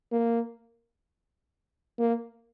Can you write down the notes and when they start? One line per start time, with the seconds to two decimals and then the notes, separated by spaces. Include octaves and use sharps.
0.12 A#3
1.99 A#3